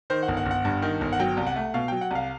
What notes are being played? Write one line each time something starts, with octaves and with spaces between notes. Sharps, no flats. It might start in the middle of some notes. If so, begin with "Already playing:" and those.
D#3 C5
F#5
G1
F#5
G1
F#5
G2
D#3
G1
F#5
F#3 G5
C2
F#5
A3
B2 F5
F#3 G5
F#5
C2 F5